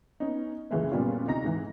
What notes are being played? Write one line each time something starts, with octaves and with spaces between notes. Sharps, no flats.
B3 C#4 D#4
C#2 F#2 C#3 E3 G#3 A3
F#2 A#2 G3 B3 C#4 F4
D2 C3 D#4 A#5 A#6
G#2 E3